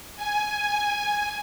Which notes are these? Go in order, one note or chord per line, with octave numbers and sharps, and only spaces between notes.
G#5